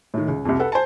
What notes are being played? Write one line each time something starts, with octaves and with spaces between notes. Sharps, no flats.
A2 D#3
C#2
C2 F2
A4 B4 F#5
C5 G#5 A5